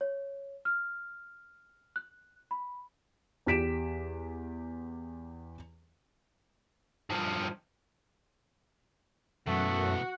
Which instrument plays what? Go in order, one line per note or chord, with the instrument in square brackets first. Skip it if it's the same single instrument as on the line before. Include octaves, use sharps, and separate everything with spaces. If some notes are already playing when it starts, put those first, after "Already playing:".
[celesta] C#5
F6
F#6
B5
[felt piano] E2 G4 B6 D7 E7
[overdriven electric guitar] G2 F3
[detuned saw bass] F#2 [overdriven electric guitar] B2 E3 [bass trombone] A3 [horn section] F#4 F#5